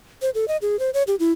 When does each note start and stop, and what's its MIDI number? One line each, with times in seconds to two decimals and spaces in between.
0.22 0.30 72
0.35 0.48 69
0.48 0.57 75
0.62 0.79 68
0.79 0.90 72
0.94 1.03 73
1.07 1.15 67
1.20 1.32 64